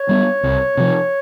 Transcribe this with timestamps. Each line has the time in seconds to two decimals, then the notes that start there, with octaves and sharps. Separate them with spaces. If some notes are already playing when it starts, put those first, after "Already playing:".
Already playing: C#5
0.09 G3 B3
0.43 C2
0.77 C3 F3